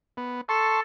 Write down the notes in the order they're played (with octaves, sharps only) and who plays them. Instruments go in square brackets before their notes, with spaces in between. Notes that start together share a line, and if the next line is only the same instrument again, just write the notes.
[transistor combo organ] B3
[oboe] A4 [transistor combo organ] A5 C6 C#6